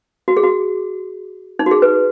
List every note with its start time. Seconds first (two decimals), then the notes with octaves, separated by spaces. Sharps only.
0.28 F#4
0.37 G#4
0.43 F#4
1.59 D#4
1.66 F#4
1.71 G#4
1.82 B4